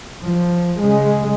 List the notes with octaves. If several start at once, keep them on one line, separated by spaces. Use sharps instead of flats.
F3
C#3 G#3